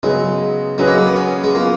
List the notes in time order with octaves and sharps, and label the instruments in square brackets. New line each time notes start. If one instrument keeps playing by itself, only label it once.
[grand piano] C#3 F#3 B3 D#4 [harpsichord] G#3
[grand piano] F#3 C#4 G#4 B4 D#5 [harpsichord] G#3
[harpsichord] A#3
A#3
B3
C#4
G#3
[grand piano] F#3 B3 F4 [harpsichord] A#3